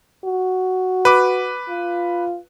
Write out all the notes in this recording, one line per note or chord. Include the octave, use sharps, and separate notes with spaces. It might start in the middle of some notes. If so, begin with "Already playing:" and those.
F#4
B4 D6
F4